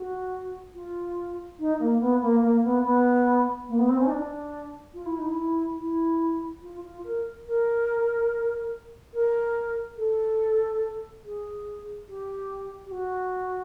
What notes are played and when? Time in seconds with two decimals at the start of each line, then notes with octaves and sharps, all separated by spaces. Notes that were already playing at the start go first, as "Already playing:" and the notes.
Already playing: F#4
0.74 F4
1.59 D#4
1.79 A#3
2.00 B3
2.21 A#3
2.42 A#3
2.63 B3
2.84 B3
3.68 A#3
3.78 B3
3.89 C4
4.00 C#4
4.06 D#4
4.10 D4
4.94 F4
5.06 E4
5.17 D#4
5.29 E4
5.78 E4
6.62 F4
6.83 F4
7.04 A#4
7.46 A#4
9.14 A#4
9.97 A4
11.23 G#4
12.08 G4
12.86 G4
12.91 F#4